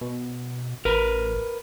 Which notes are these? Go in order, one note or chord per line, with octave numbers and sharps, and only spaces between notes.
B2
A1 A#4 B4